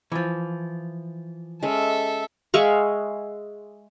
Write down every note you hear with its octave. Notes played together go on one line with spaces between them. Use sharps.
E3 F3
G#3 C#4 A4 E5 B5
G#3 E5 F5 C#6